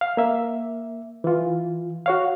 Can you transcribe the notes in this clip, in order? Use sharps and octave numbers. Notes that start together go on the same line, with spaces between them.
F5
A#3 E5
E3 F4
F#4 C#5 F5